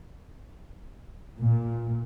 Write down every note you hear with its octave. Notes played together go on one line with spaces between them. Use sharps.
A#2